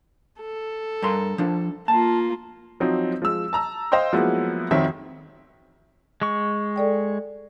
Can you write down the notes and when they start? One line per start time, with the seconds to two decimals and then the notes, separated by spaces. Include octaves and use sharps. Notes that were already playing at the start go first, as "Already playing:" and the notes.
0.41 A4
1.02 G2 A#4 C6
1.38 F3 D4
1.88 A#3 F4 A5
2.80 F3 F#3 C4 D#4
3.22 F3 G#3 E6
3.53 A5 A#5 E6
3.92 C5 D#5 F5 G5 C6
4.13 F3 F#3 G#3 A#3 B3 E4
4.71 F2 D#3 C4 F#4 C#5 E5
6.22 G#3 C#6
6.76 A4 D5 G5